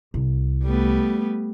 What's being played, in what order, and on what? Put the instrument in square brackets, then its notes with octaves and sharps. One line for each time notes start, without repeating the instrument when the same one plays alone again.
[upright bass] C2
[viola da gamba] G3 A3 B3